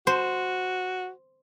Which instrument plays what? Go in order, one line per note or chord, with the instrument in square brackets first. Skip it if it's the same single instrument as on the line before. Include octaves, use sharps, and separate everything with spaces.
[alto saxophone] F#4 [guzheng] C5